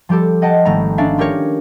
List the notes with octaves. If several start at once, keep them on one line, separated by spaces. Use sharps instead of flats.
F3 G3 G4 A4
D#5 F#5 G5 A5
G#1 G3 A3 A#5
C#4 D4 D5 E5 F5
F4 G4 A#4 C#5